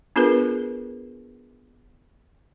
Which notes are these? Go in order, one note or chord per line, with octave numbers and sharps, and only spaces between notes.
B3 D4 F4 G#4 A#4 B4